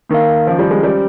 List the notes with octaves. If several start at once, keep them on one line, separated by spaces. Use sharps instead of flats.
D#3 A#3 D#4 A#4 F5
F3 C#4 G#4 C5
G3
G#3
G3 C#4 G#4 C5